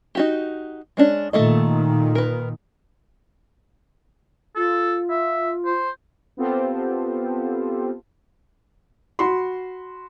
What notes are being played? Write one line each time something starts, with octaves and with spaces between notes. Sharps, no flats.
D#4 F#4 G4
G#3 C#4 D4
A#2 D#3 A3 A4 D#5
A#4 B4
F4 A4
E5
C5
B3 C4 F4 G4 A4 C5
F#4 B5 C6